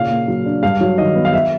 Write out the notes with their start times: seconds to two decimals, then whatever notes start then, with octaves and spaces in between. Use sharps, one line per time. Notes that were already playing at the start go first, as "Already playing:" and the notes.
Already playing: A#2 C#3 F5
0.10 A#3
0.28 F#3
0.46 D4
0.63 G2 F5
0.81 F#3
0.98 D#3 D#5
1.15 B3
1.25 F5
1.33 E5